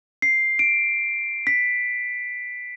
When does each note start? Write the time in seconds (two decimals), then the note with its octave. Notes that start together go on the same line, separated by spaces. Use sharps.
0.22 C7
0.59 D7
1.47 B6